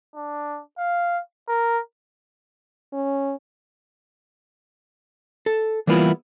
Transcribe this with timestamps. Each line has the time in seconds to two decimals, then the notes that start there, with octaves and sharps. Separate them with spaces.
0.15 D4
0.78 F5
1.48 A#4
2.93 C#4
5.46 A4
5.87 E3 G3 A#3 B3 E4 F4